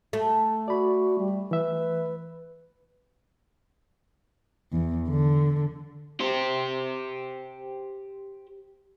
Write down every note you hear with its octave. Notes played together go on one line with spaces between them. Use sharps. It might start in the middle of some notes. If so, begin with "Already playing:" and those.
A3
F#4 D5 B5
G3
E3 B4 E5
E2
D3
G4 C5